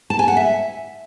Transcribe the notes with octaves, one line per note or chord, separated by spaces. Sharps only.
A5
G#5
F#5
E5